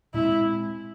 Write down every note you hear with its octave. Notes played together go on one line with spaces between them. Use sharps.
A#2 G#3 C4 E4